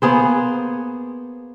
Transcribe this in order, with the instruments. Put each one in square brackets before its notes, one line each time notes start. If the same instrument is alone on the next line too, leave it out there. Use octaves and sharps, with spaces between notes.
[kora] A#3 B3 G#4 C5